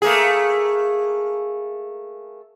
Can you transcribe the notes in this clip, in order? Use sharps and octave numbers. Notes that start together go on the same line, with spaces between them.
A3 A#3 G#4